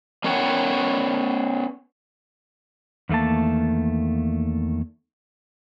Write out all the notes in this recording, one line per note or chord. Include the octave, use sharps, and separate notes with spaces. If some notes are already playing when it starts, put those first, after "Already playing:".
B3 C#4 A#4 C#5 F#5 G5
E2 D#3 A3 A#3 A5